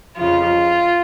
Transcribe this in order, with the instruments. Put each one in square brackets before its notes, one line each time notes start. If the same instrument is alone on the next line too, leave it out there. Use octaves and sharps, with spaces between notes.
[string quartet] F2 C#3 F3 F4